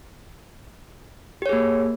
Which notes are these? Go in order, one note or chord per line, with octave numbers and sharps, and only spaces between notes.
A#3 G4 G#4 C#5